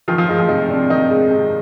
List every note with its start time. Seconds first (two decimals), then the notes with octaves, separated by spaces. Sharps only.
0.08 D#3 F3 F4
0.18 F3 F4
0.29 G#3 D#4
0.39 F3 F4
0.49 C3 D#4
0.69 C4 D4
0.90 D#3 D#4
1.10 G#3
1.30 C3